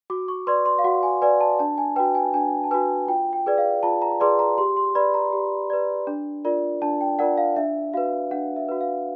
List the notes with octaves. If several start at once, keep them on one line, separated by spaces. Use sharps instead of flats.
F#4 D6
C#6
B4 D5 C6
C6
F5
F#4 F#5
G#5
B4 D5 G#5
A5
D4 A5
G#5
F#4 B4 G5
G#5
D4 G#5
A5
F#4 B4 G#5
F4 G5
G5
G#4 B4 D5
F5
F4 A5
A#5
G#4 B4 D5 C6
A#5
G4 C6
C6
B4 D5 B5
A#5
G4
B4 D5
D4
F4 A#4 D5
D4 A5
G5
F4 A#4 D5 F#5
F5
D4 E5
F#4 B4 F5
D4 F#5
E5
F#4 B4
F5